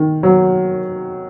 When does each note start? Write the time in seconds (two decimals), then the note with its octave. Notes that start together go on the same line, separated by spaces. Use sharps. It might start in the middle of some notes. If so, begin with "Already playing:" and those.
Already playing: D#3
0.23 F#3